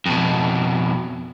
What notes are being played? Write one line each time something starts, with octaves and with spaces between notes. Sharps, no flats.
F2 B2